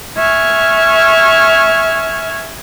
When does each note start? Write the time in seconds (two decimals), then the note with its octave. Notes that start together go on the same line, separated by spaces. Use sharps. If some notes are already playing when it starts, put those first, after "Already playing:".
0.17 E5 G#5 C#6 F6